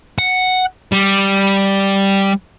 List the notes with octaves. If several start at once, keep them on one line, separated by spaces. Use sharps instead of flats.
F#5
G3